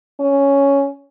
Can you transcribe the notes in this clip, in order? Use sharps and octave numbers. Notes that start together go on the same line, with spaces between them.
C#4